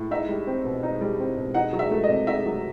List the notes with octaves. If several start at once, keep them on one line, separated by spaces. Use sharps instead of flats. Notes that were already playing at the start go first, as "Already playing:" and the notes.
Already playing: A2
D#4 E5
G3
C4
B2
D#4
G3
C4
B2
D#4 F#5
F#3
E5
A3
D#5
C3
D#4 E5
F#3